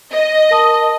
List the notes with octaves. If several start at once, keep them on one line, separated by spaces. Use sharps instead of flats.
D#5
A#4 A5 D#6